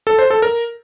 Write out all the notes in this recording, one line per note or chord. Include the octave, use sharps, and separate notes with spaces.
A4
C5
A4
A#4